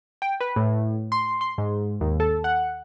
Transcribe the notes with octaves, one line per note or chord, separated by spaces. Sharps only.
G5
B4
A2
C6
C6
G#2
D#2
A4
F#5